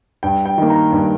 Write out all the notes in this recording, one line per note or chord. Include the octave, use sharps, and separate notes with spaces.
G2 G5
G5
D#3 A#3
A#5
G2